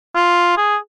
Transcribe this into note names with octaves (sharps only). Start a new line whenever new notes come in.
F4
G#4